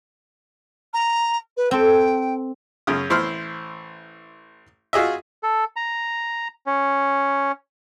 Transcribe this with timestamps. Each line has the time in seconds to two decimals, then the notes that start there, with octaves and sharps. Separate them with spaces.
0.93 A#5
1.57 B4
1.71 C4 A4 G5
2.87 F#2 C#3 D#6
3.10 A1 E4 C5 C6 F6
4.93 F4 F#4 G#4 D#5 E5
5.43 A4
5.76 A#5
6.66 C#4